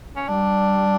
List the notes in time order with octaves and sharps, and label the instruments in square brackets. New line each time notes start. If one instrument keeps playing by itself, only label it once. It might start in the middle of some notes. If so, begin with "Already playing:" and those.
[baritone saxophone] C#4
[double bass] G3 [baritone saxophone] D4